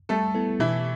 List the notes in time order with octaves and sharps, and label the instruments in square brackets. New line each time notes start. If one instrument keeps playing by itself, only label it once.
[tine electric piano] G3 [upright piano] A3 A4
[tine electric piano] B3 E4 A4
[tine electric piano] B2 [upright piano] E3 E4